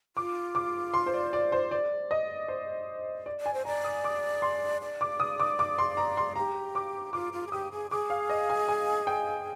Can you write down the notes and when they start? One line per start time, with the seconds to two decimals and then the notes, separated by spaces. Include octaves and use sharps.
0.16 F4 D6
0.55 D6
0.94 C6
1.06 C5
1.13 D5
1.33 D5
1.52 C5
1.71 D5
2.11 D#5
2.48 C5
3.26 D5
3.40 D5
3.46 G#5
3.54 C5
3.65 D5 A#5
3.84 D#6
4.04 D6
4.42 C6
4.82 D5
5.01 D6
5.20 D#6
5.40 D6
5.59 D6
5.78 C6
5.97 A#5
6.17 C6
6.36 G4 A#5
6.75 D6
7.13 F4 D6
7.33 F4
7.47 G#4
7.52 G4 D#6
7.72 G#4
7.91 G#4 D6
8.10 F5
8.29 D#5
8.49 G#5
8.68 G#5
9.07 G5